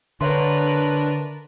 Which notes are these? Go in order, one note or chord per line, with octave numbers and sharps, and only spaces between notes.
D3 D4 A#4 B4 C#5 E5 C6